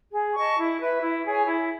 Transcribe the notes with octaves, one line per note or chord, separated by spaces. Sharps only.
G#4
D#5 A5 C#6
E4
B4 E5
E4
G#4 C#5 G#5
E4